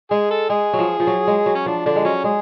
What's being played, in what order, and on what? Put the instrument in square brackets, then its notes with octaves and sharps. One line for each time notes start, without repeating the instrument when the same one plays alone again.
[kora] G#3 [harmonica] G#4
[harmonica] A4
[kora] G#3 [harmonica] G#4
[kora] F#3
F3
F3
F#3
G#3
F#3
[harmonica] C#4
[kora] F3 [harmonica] D4
[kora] D3 [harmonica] D4
[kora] G#3
[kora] F#3 [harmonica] C#4
[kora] G#3 [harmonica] G#4